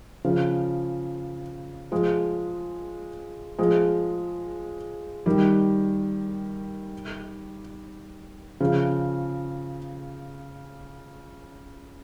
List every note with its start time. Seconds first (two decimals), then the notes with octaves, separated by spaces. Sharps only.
0.24 C#3 F3
1.92 F3 G#3
3.58 F3 G#3
5.26 D#3 G3
8.60 C#3 F3